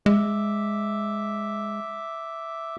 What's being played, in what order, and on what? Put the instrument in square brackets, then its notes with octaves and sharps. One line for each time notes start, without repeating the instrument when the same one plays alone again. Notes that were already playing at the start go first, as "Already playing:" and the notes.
[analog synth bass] G#3 [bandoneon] E5 D6